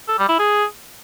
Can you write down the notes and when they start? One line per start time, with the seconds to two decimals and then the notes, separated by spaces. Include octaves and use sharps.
0.08 A4
0.18 G3
0.29 E4
0.39 G#4